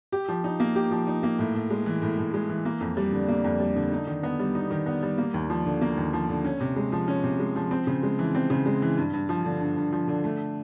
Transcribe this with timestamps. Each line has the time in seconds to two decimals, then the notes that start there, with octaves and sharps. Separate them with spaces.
0.12 G4
0.28 F3
0.44 D#4
0.60 A#3
0.75 G4
0.91 F3
1.07 D#4
1.23 A#3
1.39 A2
1.54 A2
1.70 G#3
1.86 E3
2.02 A2
2.18 A2
2.34 G#3
2.49 E3
2.65 A#3
2.81 F2
2.97 G3
3.13 D3
3.28 A#3
3.44 F2
3.60 G3
3.76 D3
3.92 D#4
4.07 D#3
4.23 B3
4.39 G3
4.55 D#4
4.70 D#3
4.86 B3
5.03 G3
5.18 A#3
5.34 D#2
5.50 F3
5.66 D3
5.81 A#3
5.97 D#2
6.13 F3
6.29 D3
6.44 C#4
6.60 C3
6.76 G#3
6.92 F3
7.08 C#4
7.24 C3
7.39 G#3
7.56 F3
7.71 C4
7.87 C#3
8.03 G#3
8.19 E3
8.35 C4
8.50 C#3
8.66 G#3
8.82 E3
8.97 G2
9.13 G2
9.29 F3
9.45 D3
9.61 G2
9.76 G2
9.92 F3
10.08 D3
10.24 A3